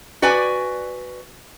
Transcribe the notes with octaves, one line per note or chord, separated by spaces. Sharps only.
F#4 B4 D5 G#5